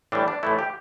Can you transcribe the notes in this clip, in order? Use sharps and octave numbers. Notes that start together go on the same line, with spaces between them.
A2 E3 G3 D4
D4
A2 E3 A3 E4
G4